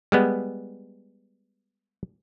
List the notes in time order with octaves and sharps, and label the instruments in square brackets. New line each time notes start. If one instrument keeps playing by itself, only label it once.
[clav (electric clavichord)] G3 G#3 B3